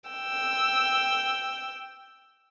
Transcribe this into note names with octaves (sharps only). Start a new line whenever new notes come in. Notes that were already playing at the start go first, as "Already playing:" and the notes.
G5 E6